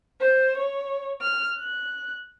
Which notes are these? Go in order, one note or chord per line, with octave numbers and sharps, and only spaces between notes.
C5
C#5
F6
F#6